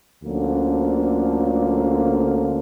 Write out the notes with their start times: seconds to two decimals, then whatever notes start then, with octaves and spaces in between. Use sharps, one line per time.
0.23 D2 D3 F3 A#3 C#4